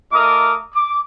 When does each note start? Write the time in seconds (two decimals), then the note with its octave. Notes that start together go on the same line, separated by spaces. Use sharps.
0.12 A3 F4 A#4 D#5 D6 D#6
0.75 D6